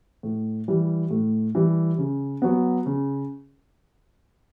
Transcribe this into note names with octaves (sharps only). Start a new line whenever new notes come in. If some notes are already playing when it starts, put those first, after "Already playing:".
A2
E3 G3
A2
E3 G3
C#3
F#3 B3
C#3